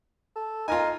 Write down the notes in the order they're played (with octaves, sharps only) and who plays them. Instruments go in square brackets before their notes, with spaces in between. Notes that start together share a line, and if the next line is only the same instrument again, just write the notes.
[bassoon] A4
[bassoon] D#4 [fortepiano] F4 A#4 G#5